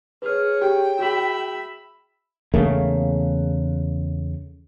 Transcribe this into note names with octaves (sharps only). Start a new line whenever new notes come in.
G#4 B4 C#5 F6
G4 G5
F#4 G#4 E5 B5 F#7
E2 C#3 A3 A#3